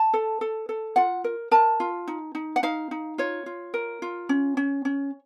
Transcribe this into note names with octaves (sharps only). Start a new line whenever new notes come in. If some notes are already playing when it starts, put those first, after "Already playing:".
Already playing: A5
A4
A4
A4
F4 F#5
A#4
A#4 A5
F4
D#4
D#4
F#5
D#4 F5
D#4
F4 C#5
F4
A#4
F4
C#4
C#4
C#4